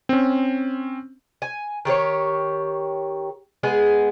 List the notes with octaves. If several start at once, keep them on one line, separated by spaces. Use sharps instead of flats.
C4 C#4
G#5
D#3 G4 A#4 C#5
G#3 B3 G#4